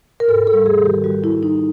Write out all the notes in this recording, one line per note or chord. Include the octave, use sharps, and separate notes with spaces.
A#4
G#2 A4
A4
G3
G#4
D#3
G4
G3 F#4
E4
G3
D#4